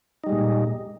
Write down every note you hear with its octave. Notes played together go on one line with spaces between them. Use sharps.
A#2 G3 G#3 D#4